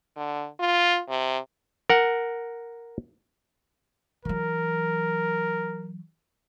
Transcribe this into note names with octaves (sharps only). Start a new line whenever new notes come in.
D3
F4
C3
A#4 F#5
E3 F#3 A#4